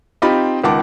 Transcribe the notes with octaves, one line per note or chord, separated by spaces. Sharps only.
C4 D#4 F4 G4 B5
C#2 D#3 F#5 A5 D6